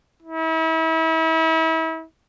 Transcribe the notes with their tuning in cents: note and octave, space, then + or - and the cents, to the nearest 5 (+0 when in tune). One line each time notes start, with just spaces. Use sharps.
E4 -35